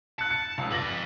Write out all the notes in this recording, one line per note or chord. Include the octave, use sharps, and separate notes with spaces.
A5 F#6 C#7
C#7
F1 C#2
B4 D5 A#6 F#7
F2